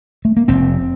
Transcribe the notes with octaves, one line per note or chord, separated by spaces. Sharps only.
A3
A#3
F1 C4